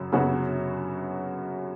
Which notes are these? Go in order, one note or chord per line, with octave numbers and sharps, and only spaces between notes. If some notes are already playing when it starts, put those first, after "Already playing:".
Already playing: F#2 C#3 F#3
F#2 C#3 F#3 B3 F#4